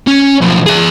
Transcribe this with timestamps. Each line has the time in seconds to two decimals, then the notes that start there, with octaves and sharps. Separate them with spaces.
0.07 C#4
0.41 B1 F3
0.66 G#4 E5